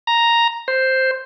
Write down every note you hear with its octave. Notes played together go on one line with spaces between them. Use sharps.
A#5
C5